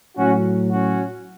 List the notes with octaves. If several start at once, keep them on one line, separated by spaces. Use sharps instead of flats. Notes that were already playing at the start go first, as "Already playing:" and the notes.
A2 F#3 C#4 F#4
C#4 F#4